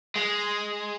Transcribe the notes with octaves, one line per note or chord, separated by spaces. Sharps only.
G#3